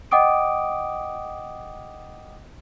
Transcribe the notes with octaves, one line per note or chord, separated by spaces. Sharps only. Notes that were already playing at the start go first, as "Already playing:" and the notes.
D#5 F#5 G5 D6 D#6 D7